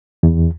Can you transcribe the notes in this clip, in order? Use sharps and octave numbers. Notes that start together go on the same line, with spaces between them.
E2